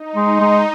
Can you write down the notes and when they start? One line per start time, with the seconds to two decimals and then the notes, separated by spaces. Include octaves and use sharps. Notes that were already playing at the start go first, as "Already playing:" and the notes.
Already playing: D#4
0.16 G#3
0.40 G#3